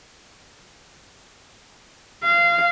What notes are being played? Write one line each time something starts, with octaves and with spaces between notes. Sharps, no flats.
F5